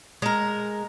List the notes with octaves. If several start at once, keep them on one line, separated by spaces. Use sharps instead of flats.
G#3 A#4